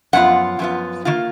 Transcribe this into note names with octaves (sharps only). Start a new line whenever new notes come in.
F#2 F3 B3 F4 F#5
F#2 F3 B3 F4
D#3 A#3 F4